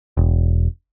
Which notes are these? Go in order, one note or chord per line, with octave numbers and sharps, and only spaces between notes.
E1